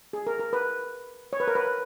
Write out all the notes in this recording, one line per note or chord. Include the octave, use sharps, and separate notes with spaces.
G#4
A#4
A#4
B4
C#5
B4
A#4
B4